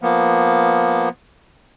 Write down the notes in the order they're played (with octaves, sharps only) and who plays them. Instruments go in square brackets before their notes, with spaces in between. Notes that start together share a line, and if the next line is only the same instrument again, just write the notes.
[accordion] F3 A#3 B3